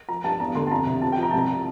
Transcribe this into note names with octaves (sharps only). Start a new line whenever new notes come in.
F3 A#5
G2 A5
E2 A#5
D3 C6
A5
F2 A#5
C3
F3 A5
G5
F3 A#5
C2 A5
A#5